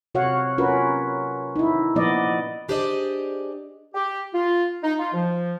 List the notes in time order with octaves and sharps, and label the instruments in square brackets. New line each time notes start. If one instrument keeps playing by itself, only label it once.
[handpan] C3 F#4 C#5 F5 F#5
C#4 F4 F#4 A#4 B4
D#4 E4
A#2 F3 B3 D5 D#5
[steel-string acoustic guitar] D4 G4 G#4 C5 D5 D#5
[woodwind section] G4
F4
D#4
F4
F3